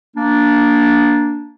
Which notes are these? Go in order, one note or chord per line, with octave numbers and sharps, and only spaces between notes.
A#3 D4